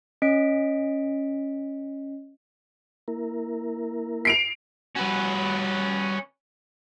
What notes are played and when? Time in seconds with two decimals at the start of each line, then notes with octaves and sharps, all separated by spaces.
0.22 C#4 D#5 B6 D7
3.08 A#3 E4 A#4
4.25 C7 D7 F7
4.96 G3 C#4 F#4 B4